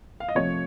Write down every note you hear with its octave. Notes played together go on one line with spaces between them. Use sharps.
F5
D#5
C3 F3 A3 C#5